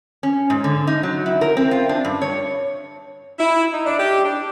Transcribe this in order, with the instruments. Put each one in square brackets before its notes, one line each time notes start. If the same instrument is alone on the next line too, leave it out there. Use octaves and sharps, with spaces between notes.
[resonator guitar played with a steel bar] C#4
G#2
D3
D#4
F#3
E4
A#4
C4
F4
D4
G2
C#5
[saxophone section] E4
D#4
D4
G4
D4